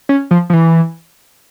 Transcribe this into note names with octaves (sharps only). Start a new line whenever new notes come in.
C#4
F3
F3
E3